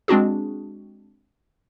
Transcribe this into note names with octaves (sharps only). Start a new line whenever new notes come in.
G#3 C4 D4 F#4 G#4